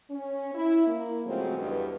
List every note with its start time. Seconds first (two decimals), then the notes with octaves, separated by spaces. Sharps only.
0.10 C#4
0.55 E4
0.87 A#3
1.26 C#3 F3 F#3 G#3 A3 C4
1.58 E2 G2 B2